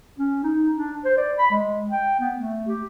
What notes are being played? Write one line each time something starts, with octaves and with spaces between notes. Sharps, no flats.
C#4
D#4
D4
C5
D5
B5
G#3
G5
B3
A3
G4